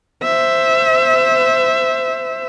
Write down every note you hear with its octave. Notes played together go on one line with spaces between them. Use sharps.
C5 E5